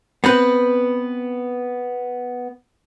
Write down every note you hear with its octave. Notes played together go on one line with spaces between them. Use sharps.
B3 C4 B4